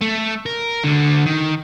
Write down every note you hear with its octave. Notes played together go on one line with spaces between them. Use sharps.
A3
A#4
D2 D3
D#3